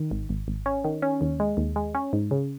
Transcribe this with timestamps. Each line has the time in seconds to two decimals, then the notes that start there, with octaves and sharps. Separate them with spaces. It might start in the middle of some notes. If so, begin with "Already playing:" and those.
Already playing: D#3
0.11 G#1
0.29 G#1
0.48 G#1
0.66 C#4
0.84 D#3
1.02 C#4
1.21 D#2
1.40 G#3
1.57 D#2
1.76 G#3
1.95 C#4
2.13 G#2
2.31 C#3